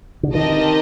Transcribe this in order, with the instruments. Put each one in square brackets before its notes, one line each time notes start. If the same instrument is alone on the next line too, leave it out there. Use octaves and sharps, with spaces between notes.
[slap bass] D3
[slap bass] D#3 [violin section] C4 G4 A#4 D#5 A5